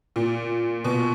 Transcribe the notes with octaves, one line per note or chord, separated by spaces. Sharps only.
A#2
B2